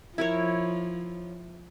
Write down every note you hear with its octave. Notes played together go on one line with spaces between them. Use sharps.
F3 E4 A#4 C#5